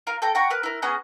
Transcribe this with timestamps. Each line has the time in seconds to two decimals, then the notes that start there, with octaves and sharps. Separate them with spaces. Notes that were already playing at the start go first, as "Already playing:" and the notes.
0.07 F4 A#4 F5
0.22 A4 G5 A#5
0.35 F#5 G5 A#5 C#6
0.50 A#4 B4 F#6
0.63 E4 A#4
0.82 B3 C#4 G#4 A#5